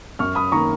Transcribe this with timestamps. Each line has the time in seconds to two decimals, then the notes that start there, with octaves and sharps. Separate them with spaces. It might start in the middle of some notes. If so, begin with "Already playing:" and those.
0.19 F#2 C#6 F6
0.35 B5 D#6
0.52 D#3 A#3 A#5 C#6